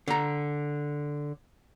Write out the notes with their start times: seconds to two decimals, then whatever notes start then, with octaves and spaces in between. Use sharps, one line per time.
0.08 D3 A#5